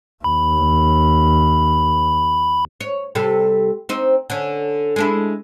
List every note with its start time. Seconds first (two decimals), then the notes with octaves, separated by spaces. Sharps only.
0.24 D#2 B5
2.81 C#5
3.15 C3 G3 A4
3.89 C4 D#4
4.30 D3 C#4
4.96 G#3 D4 E4